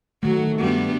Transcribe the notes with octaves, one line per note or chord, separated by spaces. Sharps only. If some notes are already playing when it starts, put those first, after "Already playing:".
D#3 F#3 A3 F#4
G2 G3 B3